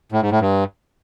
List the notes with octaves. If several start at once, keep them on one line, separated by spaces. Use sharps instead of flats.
A2
G#2
A2
G2